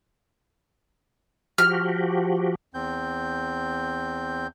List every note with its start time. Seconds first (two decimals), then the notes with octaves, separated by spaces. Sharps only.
1.58 F3 F#4 G4 F6
2.74 E2 C4 G6